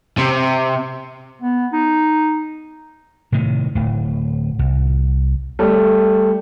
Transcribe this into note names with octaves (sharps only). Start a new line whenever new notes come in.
C3
B3
D#4
A2 C3 D#3
D1 A2
C2
G3 A3